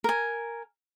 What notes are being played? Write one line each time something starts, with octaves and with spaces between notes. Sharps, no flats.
A#4 G#5